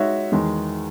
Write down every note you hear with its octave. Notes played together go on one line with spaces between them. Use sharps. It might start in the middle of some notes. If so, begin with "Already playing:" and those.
Already playing: G#3 D#4 F#4 C#5 E5
E2 D#3 G#3